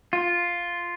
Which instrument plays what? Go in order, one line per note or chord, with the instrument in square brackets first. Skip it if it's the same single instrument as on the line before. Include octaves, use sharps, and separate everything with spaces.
[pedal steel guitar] F4